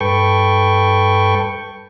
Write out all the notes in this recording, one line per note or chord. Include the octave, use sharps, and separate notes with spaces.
G2 A4 B4 G5 C#6